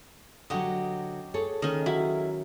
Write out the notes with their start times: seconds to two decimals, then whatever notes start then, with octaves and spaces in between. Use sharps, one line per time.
0.50 D3 F#3 F#4 G4 D#5
1.34 G#4 A4 C#5
1.62 D#3 C#4 D#5
1.86 F#3 E4